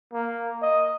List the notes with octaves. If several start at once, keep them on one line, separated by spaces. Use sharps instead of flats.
A#3
D#5